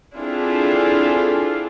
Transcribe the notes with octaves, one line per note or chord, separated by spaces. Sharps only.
C4 D4 E4 F4 G#4 A4